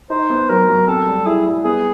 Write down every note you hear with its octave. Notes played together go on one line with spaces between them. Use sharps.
D#4 C5
B3
F#3 A#4
F#3
C4 A4
G3
E4 G#4
G3
B3 G#4